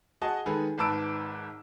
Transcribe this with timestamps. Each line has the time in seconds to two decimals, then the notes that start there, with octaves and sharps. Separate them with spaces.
0.22 F#4 G#4 D#5 A5
0.46 D#3 G#3 G#4 A4 B4
0.78 G#1 G#2 B4 A5 E6 D7